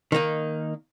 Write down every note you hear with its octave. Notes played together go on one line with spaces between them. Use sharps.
D#3 A#3 D#4